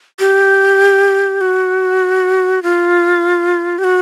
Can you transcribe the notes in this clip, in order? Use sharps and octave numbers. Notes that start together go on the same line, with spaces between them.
G4
F#4
F4
G4
F#4